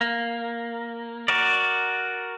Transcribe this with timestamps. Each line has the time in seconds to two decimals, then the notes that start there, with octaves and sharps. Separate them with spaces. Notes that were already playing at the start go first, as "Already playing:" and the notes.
0.01 A#3
1.28 F#4 A#4 D5